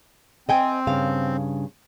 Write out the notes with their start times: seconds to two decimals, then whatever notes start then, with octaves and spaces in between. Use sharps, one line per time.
0.49 C4 D#5 G5 G#5
0.87 G2 C#3 F5